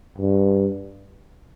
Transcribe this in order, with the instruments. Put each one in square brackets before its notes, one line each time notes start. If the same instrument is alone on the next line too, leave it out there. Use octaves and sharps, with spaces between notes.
[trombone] G2